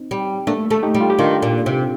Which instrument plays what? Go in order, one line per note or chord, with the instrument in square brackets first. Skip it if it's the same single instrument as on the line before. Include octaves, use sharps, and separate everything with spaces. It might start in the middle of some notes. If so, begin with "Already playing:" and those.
Already playing: [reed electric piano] C4 D#4
[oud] G3
[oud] A3 [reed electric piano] A#3 D4
[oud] A3 [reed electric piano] A4
[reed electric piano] D#4 G4
[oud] G3
[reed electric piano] F4
G4
[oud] D#3 [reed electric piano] D4 F4
[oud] A#2
C3